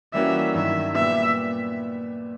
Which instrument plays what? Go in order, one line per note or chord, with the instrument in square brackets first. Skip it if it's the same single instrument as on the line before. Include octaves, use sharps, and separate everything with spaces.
[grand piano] E3 G3 A#3 C#4 F#4 [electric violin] E5
[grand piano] G2 D#3 F#3 [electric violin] E5
[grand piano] A#2 G3 B3 [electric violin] E5